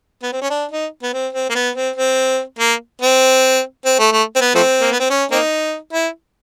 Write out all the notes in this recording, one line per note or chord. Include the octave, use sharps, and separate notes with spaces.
B3
C4
C#4
D4
D#4
B3
C4
C4
A#3
B3
C4
C4
A#3
C4
C4
A3
A3
C4
B3
F3 A3 C4
A#3
B3
C4
C#4
A#3 C4 D#4
E4